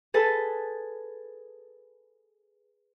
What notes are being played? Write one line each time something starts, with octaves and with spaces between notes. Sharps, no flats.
G#4 A4 B4 A5